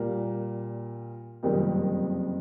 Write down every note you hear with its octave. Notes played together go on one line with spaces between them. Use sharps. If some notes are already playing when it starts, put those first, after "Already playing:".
Already playing: A#2 G3 A#3
F#1 F2 C3 D#3 G3